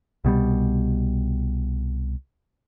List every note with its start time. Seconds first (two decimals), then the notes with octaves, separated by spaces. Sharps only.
0.25 C2 B2 G3